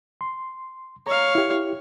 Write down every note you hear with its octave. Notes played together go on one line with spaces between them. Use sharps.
C6
C#5 F5 A#5
E4 G4